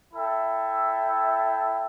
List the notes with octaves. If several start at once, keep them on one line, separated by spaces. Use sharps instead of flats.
E4 A4 E5 G5